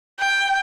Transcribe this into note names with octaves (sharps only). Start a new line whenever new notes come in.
G5